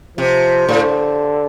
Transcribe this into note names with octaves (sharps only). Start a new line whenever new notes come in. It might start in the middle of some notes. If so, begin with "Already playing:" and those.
C3 F3
A2 D3